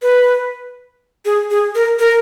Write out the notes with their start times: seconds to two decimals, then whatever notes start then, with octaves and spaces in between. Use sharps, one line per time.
0.02 B4
1.25 G#4
1.51 G#4
1.75 A#4
1.99 A#4